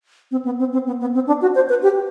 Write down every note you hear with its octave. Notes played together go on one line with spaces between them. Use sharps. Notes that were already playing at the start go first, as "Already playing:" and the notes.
C4
B3
C4
C4
B3
B3
C4
D4
F#4
C5
B4
G4